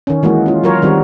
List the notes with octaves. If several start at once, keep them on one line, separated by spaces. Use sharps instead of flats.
D#3 C#4
E3 G#3 A#3 F#4
C#4 F4
F#3 F4 A#4 C#5
D#3 G3 C4 F#4